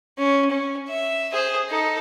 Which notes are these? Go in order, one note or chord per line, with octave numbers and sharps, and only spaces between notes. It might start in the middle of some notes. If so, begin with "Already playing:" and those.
C#4
C#4
E5
G#4 C5
D#4 A4